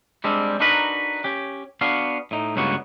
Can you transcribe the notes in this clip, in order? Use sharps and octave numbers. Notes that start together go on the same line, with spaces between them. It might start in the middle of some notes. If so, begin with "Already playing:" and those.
G3 G#3 C4 D4
D4 D#4 F#4 A#4 B4
C#4 G4
B3 D4 F#4 F5
A2 D#4
C#2 G2 C#3 A#3 B3 F#4